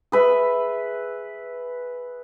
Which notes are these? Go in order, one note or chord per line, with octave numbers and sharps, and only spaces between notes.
G#4 B4 E5